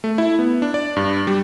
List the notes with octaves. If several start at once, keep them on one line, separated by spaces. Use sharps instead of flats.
A3
E4
B3
D4
D5
G2
G3